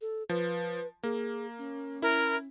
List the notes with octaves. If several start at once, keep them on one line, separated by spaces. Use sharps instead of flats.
A4
F3 B4
A#3 G#4
C#4
E4 A#4